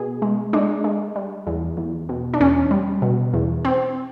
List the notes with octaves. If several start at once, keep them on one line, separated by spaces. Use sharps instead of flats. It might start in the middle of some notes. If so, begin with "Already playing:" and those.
Already playing: B2 G#4
G#3
G#3 D4
G#3
G3
E2
E2
B2
D4
E2 C#4
G3
B2
E2
C4